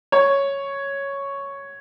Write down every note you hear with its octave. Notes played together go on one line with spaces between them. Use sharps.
C#5